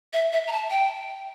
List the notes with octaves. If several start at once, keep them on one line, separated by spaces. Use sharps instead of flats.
E5
E5
A#5
A5
G5